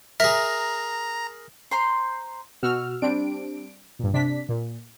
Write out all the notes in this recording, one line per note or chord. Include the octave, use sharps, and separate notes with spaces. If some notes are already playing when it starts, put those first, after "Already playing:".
G#4 A#4 E5 A#5
C5 A#5 C6
B2 F#4 E6 F6
G3 C4 D4 D7
G2 A#2
C3 D4 B6
A#2